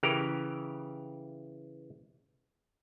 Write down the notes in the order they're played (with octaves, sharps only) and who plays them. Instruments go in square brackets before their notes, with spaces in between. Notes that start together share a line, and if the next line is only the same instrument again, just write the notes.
[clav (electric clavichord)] C#3 E3 G4 A#4